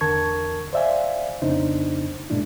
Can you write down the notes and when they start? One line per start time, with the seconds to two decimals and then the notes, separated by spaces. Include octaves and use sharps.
0.01 E2 D3 A#4 A5 C#6 G#6
0.73 C5 D5 E5 F5 G#5
1.42 F2 C#3 B3 D4 D#4 C5
2.30 F#2 A#2 G#3 D4 E4